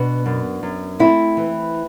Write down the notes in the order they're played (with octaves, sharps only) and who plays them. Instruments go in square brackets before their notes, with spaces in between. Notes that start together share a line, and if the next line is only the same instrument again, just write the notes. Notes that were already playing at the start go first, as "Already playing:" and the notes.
Already playing: [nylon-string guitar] B2 B3 D4
F#2
F#2
A3 C4 E4
E3